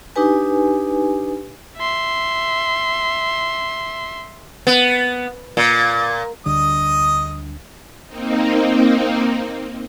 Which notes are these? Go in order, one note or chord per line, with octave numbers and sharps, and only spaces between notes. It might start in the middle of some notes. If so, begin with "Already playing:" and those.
D4 D#4 G4 B4 G#5
E5 C6
B3
A#2
D2 D3 G3 D#5 D#6
A#3 C4 D#4